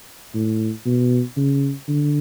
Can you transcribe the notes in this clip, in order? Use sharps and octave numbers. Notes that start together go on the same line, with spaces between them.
A2
B2
C#3
D3